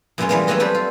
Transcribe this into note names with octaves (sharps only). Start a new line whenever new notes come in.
F#2 B2 F#3 G#3 B3 C#4
E3 G3 G#3 A#3 B3
F#3 A3 B3 C#4 F#4 D#5
G3 C4 G4 B4 C5 D5
F4